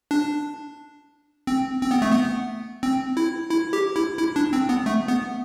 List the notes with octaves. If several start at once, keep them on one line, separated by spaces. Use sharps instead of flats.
D4
C4
C4
B3
A3
B3
C4
E4
E4
G4
E4
E4
D4
C4
B3
A3
B3